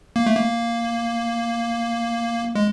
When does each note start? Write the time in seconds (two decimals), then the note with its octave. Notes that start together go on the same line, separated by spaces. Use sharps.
0.16 A#3
0.26 A3
0.37 A#3
2.55 G#3